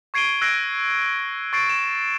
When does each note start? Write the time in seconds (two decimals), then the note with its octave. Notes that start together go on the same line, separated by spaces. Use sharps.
0.14 C#6 G#6 C7 D7 D#7 G7
0.42 E6 F#6 G#6 A#6 C7 D7
1.53 C#6 A6 C7 D7
1.70 E7